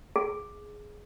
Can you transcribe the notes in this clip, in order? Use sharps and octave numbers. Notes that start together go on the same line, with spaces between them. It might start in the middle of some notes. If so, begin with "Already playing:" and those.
G#4